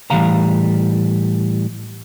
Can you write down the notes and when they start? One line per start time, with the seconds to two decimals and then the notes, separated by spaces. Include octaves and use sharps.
0.10 A2 E3 F#3 G3 F5 A#5